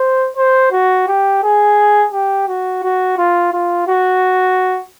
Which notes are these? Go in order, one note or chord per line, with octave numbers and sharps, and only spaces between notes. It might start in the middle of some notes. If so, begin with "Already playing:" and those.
Already playing: C5
C5
F#4
G4
G#4
G4
F#4
F#4
F4
F4
F#4